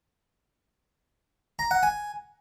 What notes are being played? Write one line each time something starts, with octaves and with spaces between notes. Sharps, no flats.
A#5
F#5
G#5